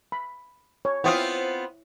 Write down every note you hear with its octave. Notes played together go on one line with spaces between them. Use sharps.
B5
C#5
B3 C4 E4 F4 D#6